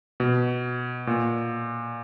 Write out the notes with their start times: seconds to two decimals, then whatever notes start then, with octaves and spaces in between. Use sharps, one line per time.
0.20 B2
1.07 A#2